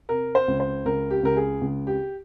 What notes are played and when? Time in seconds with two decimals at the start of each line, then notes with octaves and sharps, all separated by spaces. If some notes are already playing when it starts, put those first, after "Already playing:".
0.09 C3 A#4
0.35 C5
0.48 C#2
0.60 C5
0.85 C#2 A#4
1.10 G4
1.23 C#2 A#4
1.37 G#4
1.61 C#2
1.87 G4